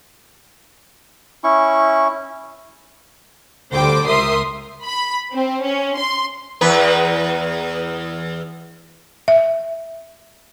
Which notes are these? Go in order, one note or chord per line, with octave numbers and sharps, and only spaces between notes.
C#4 E4 C#6
D2 D3 G3 C5 G5 D6
C#2 A#4 E5 C6 D#6 C7
B5
C4
C#4
C6
E2 B4
E5